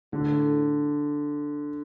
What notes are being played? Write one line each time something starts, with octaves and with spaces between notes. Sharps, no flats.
A2 D3